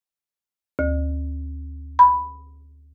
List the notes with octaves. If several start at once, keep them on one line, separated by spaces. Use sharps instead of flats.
D2
B5